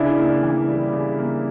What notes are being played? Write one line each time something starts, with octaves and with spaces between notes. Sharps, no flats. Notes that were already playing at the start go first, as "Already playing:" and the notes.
Already playing: C#3 D4 E4
A#3
E3
G3
C#3
A#3